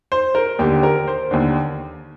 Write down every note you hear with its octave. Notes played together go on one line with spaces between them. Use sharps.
C5
A#4
D#2 D3 G4
A#4
C5
D#2 D3